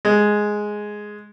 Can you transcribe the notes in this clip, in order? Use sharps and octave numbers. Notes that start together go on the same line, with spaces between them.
G#3